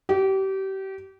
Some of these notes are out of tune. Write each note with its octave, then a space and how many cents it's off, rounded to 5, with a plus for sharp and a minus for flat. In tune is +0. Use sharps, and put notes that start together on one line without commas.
G4 -30